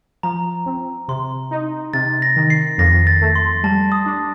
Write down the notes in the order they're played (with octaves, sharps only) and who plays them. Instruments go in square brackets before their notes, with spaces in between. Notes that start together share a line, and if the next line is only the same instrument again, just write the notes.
[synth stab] F3 [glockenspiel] A#5
[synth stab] C4
[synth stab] C3 [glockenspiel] C6
[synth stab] D#4
[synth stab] C3 [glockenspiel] A6
[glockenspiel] A#6
[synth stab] D#3
[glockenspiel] C7
[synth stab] F2 [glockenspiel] A#6
[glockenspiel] A6
[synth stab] A3
[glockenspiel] C6
[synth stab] G3 [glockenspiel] A5
[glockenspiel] D#6
[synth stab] D4